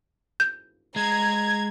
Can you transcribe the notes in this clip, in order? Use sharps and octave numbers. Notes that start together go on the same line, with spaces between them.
G6
G#3 A#5 G#6